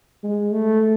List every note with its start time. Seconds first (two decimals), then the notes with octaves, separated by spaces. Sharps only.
0.23 G#3
0.52 A3